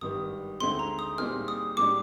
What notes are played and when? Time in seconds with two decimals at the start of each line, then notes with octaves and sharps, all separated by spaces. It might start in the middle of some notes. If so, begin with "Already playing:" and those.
0.01 G#1 G2 D#3 G3 D#6
0.60 D2 D3 G#3 C4 D#4 C6
0.79 A#5
0.99 D#6
1.18 A#2 G3 C4 D#4 G#4 F6
1.48 D#6
1.77 G#2 G3 D4 D6